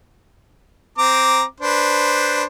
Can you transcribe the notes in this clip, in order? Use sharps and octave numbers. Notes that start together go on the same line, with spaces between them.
C4 A#5 D6
D4 B4 C5